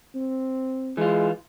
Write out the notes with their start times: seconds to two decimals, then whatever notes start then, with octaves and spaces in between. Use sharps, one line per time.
0.15 C4
0.97 E3 G#3 F4